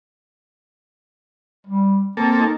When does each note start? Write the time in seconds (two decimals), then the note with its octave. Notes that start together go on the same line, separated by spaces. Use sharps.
1.67 G3
2.17 A#3 C4 A4
2.39 D#4